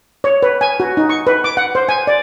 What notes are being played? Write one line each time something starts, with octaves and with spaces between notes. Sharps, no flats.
C#5
B4
G#5
F#4
D#4
C#6
B4
D6
F#5
C5
G#5
D5